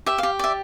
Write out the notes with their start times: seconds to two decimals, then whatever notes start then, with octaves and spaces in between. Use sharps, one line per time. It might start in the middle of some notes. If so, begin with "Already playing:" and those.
0.06 G4 E5
0.18 G4 F5
0.39 D5 E5